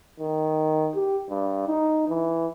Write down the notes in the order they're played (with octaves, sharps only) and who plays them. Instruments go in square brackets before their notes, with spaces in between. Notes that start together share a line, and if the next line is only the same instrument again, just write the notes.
[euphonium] D#3
G4
G2
D#4
E3